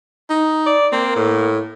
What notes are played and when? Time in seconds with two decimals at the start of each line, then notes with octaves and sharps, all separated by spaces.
0.30 D#4
0.67 D5
0.92 A#3 C4
1.16 A2